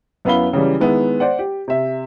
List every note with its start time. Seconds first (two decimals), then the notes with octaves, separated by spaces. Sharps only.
0.25 F#2 B3 E4 F5 B5 G7
0.53 C#3 E3 F#3 G3
0.80 D#3 G#3 B3 E4
1.20 C5 D5 F#5
1.39 G4
1.68 C3 E5